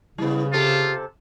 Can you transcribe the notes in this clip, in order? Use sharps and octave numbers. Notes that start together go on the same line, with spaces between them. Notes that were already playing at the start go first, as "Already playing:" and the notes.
C#3 G3 B3 E4
C3 F4 G4 A4